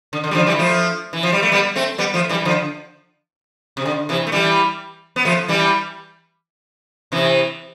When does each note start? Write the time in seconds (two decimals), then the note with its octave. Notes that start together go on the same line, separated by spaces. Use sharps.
0.13 D3
0.24 D3
0.31 G3
0.35 D3 F3
0.47 E3 G3
0.59 F3 A3
1.13 E3
1.23 F3
1.32 G3
1.43 A3
1.52 G3 B3
1.76 A3 C4
1.98 G3 B3
2.14 F3 A3
2.29 E3 G3
2.45 D3 F3
3.77 C3
3.86 D3
4.09 C3 E3
4.27 A3
4.32 E3 G3
5.16 B3
5.25 F3 A3
5.48 E3 G3
7.12 C3 E3